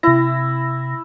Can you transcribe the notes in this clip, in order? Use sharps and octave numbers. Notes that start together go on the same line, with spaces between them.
C3 E4 A#6